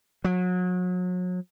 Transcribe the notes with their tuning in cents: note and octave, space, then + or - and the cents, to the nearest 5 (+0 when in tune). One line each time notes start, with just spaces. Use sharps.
F#3 -35